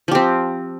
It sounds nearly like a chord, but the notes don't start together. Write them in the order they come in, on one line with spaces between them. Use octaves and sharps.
F3 G4 C4